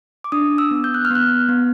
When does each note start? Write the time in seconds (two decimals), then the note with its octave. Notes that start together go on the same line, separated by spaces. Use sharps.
0.24 D6
0.32 D4 D#6
0.58 E6
0.71 B3
0.84 G6
0.94 F#6
1.05 F6
1.10 B3
1.15 F#6
1.49 B3